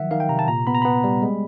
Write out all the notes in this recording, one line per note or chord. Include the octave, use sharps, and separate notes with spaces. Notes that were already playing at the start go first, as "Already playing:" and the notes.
Already playing: D#3 F3 F#3 E5 F#5
D#3 F5
G5
C3 A#5
A5
A#2 A#5
B3 B5
A#5
B3 B5
G3
G#3